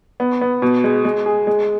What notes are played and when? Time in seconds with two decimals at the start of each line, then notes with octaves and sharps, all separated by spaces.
0.20 B3
0.41 B3
0.62 B2
0.84 G#3
1.05 G#3
1.26 G#4
1.47 G#3